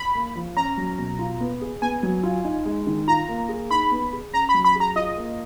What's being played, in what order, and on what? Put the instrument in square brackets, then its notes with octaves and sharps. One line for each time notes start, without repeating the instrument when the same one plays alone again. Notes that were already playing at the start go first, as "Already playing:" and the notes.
Already playing: [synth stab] B5
[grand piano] A#3
F3
[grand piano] C#4 [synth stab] A#5
[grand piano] F#3
B2
F4
B3
G#4
[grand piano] B3 [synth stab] G#5
[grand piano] F#3
F4
D#4
G#3
D#3
[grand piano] F4 [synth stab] A#5
[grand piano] A#3
G#4
[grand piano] D#4 [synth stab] B5
[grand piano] B3
G#4
[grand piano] C#4 [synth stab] A#5
[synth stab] B5
[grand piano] F#3
[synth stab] B5
[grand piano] G#4
[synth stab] A#5
[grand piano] F4 [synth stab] D#5
[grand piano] A#3